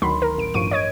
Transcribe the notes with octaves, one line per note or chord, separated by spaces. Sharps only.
D2 D#3 F#3 B5 C6
A#4
A1 D7
A1 G2 F3 C#6 D7 D#7
C#5 D#5 G#6 D7